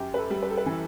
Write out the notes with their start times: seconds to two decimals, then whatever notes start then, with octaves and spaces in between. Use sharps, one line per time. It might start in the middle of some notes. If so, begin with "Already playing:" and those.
Already playing: F#2 G4
0.14 B4
0.18 A4
0.30 G3
0.43 B4
0.50 A4
0.58 B4
0.66 E3